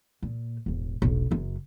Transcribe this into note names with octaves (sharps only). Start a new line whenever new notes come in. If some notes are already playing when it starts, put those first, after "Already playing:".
A#2
E1 A1
E1 B1
F#1 F#2